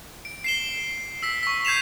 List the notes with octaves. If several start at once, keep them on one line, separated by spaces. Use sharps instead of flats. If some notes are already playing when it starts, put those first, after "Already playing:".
D7
C7 E7 G7
E6 B6
C#6 B6
G6 G#6 C7 E7 F7